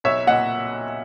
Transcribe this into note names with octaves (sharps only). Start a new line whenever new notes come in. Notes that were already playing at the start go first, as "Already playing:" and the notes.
B1 C#5 E5
A#2 D#5 F#5